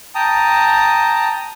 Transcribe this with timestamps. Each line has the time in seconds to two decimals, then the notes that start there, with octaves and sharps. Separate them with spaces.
0.15 G5 A5 A#5 D#6